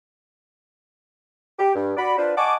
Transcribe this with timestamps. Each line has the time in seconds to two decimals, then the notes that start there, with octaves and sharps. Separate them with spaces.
1.58 G4
1.75 G2
1.97 F#4 D5 B5
2.17 D4 F4 B4 C5
2.36 D#5 F#5 G#5 A5 C#6 D6